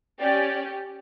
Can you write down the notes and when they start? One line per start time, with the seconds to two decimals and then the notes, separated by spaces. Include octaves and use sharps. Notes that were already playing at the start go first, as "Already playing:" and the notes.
0.20 C#4 G4 D5